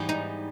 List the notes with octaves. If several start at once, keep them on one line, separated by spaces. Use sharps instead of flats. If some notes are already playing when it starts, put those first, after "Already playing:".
Already playing: G#2 E3 G3 B3
D#4